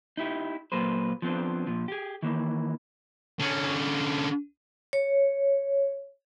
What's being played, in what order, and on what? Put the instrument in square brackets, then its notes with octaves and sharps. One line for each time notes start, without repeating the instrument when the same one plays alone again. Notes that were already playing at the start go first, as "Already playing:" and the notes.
[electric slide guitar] D#4 E4 G4
A#2 F#3 A#3 B4 C5
F3 B3 C4 D4
A#2 F3
G4 G#4
D#3 E3 A#3
[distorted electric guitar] D3 C#4
[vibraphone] C#5